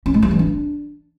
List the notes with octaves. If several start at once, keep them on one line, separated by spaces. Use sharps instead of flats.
C#4
G#3
G3
E3
D4